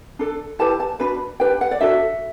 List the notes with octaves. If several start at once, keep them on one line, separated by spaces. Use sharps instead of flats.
D4 A4
E4 G4 B4 A5
A5
D4 F#4 B4 B5
D4 G4 B4 G5
F#5
D5
D4 F#4 A4 E5